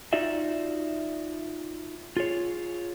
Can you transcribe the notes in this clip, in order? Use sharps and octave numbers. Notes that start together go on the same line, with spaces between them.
D#4 F4 F#4 D5 E5
F4 G#4 C#5